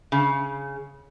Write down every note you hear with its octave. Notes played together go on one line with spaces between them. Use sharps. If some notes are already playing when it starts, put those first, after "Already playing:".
C#3